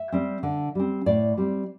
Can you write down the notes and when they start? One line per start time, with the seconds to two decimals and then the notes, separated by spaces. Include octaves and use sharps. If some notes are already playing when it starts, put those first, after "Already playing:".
Already playing: E5
0.12 G3 C4
0.43 D3
0.75 G3 C4
1.06 A2 D5
1.37 G3 C4